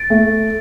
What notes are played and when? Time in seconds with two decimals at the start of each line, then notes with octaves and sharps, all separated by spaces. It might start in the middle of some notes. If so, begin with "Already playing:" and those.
Already playing: A6 D7
0.10 A3